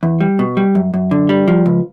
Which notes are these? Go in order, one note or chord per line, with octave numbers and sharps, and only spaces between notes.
E2
G3
B2
G3
F#2
F#2
D3
G3
F3
C#2